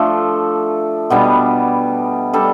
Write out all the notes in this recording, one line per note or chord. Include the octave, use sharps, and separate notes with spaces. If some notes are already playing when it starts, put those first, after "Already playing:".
Already playing: F3 A3 D4 A4
B2 G3 B3 D4
G3 D4 A4